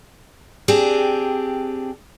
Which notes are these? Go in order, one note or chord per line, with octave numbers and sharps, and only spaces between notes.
C4 D4 G4 G#4